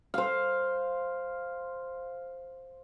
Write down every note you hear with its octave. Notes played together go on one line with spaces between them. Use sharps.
C5 F5